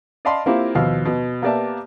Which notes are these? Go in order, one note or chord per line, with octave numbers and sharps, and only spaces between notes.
D5 D#5 F5 A5 B5 C6
A#3 C4 E4 F4 G4
D#2 B2 F3 F5 E6 F6
B2
A#3 B3 G4 D5 E5 A5